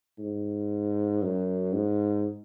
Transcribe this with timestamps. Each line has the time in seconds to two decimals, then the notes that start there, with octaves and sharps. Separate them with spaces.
0.19 G#2
1.23 F#2
1.74 G#2